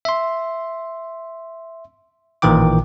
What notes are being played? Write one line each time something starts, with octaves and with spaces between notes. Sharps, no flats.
E5 C6
A1 A#2 D#3 E3 G5 D6